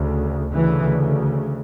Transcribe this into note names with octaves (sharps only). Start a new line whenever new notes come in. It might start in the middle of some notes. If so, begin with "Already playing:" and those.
Already playing: D2 C#3
D2 C#3 E3